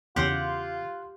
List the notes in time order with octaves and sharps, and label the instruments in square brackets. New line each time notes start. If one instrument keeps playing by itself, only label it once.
[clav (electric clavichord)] E2 C#3 [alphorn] F4 [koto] G4 F#5 [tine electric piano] F5 C6 F#6